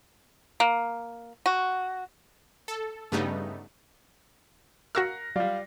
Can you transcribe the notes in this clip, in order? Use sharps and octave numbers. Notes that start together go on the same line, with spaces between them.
A#3
F#4
A4
G2 C#3 G3 A3 B3 D#4
F#4 A#4 F5 C#6 E6 F#6 A#6 C#7
F#3 G3 F4 D5 F5